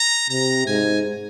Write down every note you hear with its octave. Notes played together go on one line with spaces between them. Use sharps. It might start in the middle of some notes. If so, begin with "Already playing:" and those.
Already playing: A#5
C3 A#5
G#2 G#5